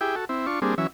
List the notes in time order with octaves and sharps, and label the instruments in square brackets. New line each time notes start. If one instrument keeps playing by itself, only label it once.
[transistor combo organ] E4 G4 G#4 G5
F#4 A4
C4 E4
D4 F4 C#6
G3 A#3 C4 D4 G#4
E3 F#3 C#4 E5